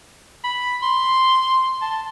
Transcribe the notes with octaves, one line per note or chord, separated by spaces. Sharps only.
B5
C6
A5